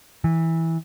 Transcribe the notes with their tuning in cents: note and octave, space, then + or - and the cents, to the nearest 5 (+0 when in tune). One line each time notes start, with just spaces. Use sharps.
E3 -15